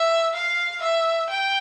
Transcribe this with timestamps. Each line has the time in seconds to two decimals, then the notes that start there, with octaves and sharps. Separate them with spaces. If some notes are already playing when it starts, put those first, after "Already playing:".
Already playing: E5
0.35 F5
0.82 E5
1.30 G5